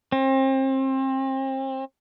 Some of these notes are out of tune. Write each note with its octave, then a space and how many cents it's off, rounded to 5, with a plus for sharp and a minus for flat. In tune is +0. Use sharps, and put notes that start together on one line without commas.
C4 +35